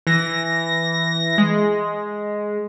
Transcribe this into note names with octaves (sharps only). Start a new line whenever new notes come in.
E3 A#6
G#3